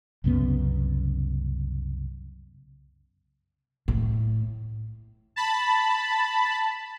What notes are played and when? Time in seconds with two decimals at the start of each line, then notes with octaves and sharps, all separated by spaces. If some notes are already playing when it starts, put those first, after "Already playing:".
0.24 C2 F#2 C#3 B3
3.88 A2
5.36 A5 B5